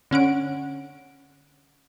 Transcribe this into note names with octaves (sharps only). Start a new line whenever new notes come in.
D3 C#4 F#5 D7